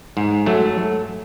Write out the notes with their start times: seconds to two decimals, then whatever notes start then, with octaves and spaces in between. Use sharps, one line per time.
0.17 G#2
0.46 F#3 A3